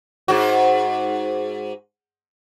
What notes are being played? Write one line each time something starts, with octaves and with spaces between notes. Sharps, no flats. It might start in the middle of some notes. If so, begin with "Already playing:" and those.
G#2 F#4